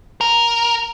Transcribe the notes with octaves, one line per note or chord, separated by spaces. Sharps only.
A#4